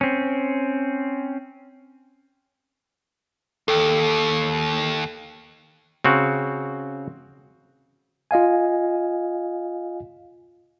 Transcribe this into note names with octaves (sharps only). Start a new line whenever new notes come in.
C4 C#4
D#2 A4 G5
C#3 C4 F#4
F4 D#5 F5 G#5